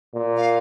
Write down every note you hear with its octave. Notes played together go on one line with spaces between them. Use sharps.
A#2
F5